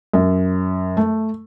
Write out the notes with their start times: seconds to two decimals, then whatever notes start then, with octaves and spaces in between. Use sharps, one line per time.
0.13 F#2
0.97 A3